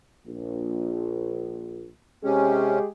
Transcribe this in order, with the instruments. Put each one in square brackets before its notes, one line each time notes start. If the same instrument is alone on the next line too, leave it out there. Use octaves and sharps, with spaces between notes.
[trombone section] A#1
[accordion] C3 C#4 [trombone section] G#3 G4 G#4